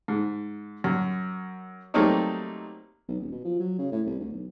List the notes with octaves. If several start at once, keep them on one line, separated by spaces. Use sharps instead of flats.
G#2
F#2
F#3 G3 A3 A#3 C4 D#4
B1
D#1
B2
F3
F#3
C#3
A2
C2
D2
B1